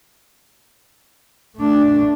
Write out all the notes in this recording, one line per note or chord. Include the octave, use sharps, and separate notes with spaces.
A3 D4